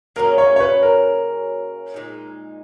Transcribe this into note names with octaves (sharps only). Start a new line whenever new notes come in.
C#3 F#3 A#3 C#4 A#4
C#5
C#5
B4
A#4
A#2 G#3 D#4